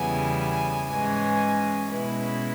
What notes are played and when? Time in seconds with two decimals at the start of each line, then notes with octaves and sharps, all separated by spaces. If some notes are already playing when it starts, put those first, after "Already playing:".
Already playing: E2 C#3 G3 B3 E4 G#5
0.39 G#5
0.88 G#2 E3 G#3 C#4 G#5
1.89 B2 G#3 C#4 E4 B4